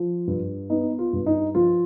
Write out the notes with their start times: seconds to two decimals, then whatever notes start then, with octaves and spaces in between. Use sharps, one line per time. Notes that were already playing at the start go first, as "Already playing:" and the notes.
Already playing: F3
0.27 G2
0.69 B3 D#4
0.99 F4
1.13 G2
1.26 D#4
1.55 F3 F4